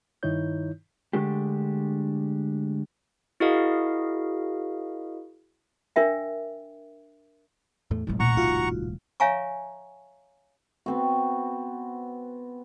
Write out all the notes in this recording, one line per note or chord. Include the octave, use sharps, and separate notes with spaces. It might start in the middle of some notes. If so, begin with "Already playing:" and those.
G2 D#3 D#4 E4 C#5 G6
D3 G#3 A3 D4 G4
E4 F#4 G#4 A#4 D#5 F5
D4 A#4 E5 G5
E2 A2 A3
D#1 C2 A2 F#3 G#3
A#2 F#5 A#5 C#6
D#4 F4 F#4
C#5 E5 F5 G#5 A#5 C#6
B3 C4 F#4